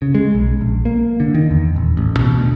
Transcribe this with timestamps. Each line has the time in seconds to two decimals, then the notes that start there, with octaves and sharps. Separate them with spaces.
0.02 C#3
0.15 G#3
0.35 B1
0.61 A#1
0.85 A#3
1.20 D3
1.35 D#3
1.51 E2
1.76 D#1
1.97 A1
2.17 B2
2.38 D2